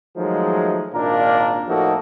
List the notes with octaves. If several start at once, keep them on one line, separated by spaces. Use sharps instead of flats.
D#3 F3 F#3 G#3 A3 D#4
G#1 A#2 A#3 D4 F4 A#4
A2 F3 A#3 D#4 F#4 A4